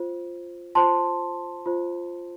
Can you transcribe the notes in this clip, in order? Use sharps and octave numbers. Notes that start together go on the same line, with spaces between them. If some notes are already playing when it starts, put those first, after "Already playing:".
Already playing: F4 C5
F4 C5 A5 C6
F4 C5